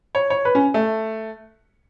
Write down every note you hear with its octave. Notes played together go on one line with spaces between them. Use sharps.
C#5
C#5
B4
C#4
A3